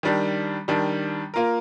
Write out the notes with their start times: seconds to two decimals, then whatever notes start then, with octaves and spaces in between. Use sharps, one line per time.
0.03 D#3 G3 D4
0.68 D#3 G3 D4
1.34 A#3 F4 A#4